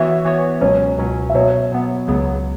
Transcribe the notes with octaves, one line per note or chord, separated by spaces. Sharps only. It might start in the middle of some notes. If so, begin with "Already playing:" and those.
Already playing: E3 B3 F#4 C#5 E5
E3 B3 F#4 C#5
C#2 B2 F#3 C#4 C#5
C#2 B2 F#3 C#4
E5
B2 F#3 B3 C#5
B2 F#3 B3
C#2 C#3 F#3 B3